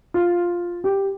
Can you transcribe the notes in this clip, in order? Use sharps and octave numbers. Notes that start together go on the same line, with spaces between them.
F4
G4